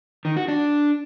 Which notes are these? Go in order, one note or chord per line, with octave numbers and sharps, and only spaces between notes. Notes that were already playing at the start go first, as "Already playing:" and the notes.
D#3
F#4
D4